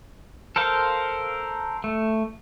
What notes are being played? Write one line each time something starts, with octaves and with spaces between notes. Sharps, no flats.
A4 A#4 C5 F5
A3